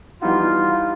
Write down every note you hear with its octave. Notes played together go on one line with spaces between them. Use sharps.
E3 G3 B3 D#4 F4 F#4